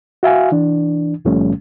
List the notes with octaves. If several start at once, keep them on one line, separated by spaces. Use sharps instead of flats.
F#4 E5 F5 G#5
E3 D4
C#2 A#2 F3 G3 A3 C#4